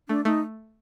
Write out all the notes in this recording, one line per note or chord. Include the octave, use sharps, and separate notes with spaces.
A3 D4
A3 D#4